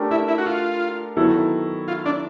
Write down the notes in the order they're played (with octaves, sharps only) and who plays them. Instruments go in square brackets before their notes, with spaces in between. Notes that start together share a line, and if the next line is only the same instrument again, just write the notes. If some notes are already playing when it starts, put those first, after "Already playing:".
Already playing: [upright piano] A3 D4 G4 A#4
[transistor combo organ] E4
E4
F#4
F4
[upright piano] D#3 F#3 B3 E4 A4
[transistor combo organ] F4
D4